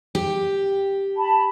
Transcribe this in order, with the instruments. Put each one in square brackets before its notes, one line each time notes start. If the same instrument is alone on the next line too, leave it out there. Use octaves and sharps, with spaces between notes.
[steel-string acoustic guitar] G4
[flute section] A5 B5